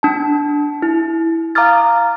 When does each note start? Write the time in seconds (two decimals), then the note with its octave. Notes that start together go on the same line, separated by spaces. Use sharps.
0.03 D4 A5
0.82 E4
1.55 F5 A#5 D6 D#6 F6 A6